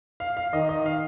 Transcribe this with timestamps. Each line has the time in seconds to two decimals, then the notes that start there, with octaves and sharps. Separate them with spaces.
0.20 F5
0.37 F5
0.53 D#3 D#5
0.69 D#5
0.86 F5